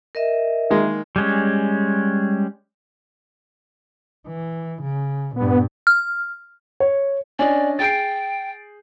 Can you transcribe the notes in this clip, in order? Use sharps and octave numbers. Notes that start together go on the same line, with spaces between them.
A#4 D#5 E5
D#3 G#3 A#3
G3 G#3 C#4
E3
C#3
G2 A#2 B3
F6
C#5
C#4 D4 D5 D#5 G#5
G#4 G5 G6 A6 C7 D7